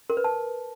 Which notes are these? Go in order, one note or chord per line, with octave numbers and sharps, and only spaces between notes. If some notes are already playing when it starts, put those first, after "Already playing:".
A#4
B4
A5